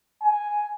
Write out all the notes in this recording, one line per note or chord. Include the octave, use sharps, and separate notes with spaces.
G#5